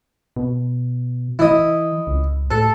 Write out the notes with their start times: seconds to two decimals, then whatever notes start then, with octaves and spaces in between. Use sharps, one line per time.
0.36 B2
1.39 E3 E4 D#5
2.07 C#2
2.51 A2 A4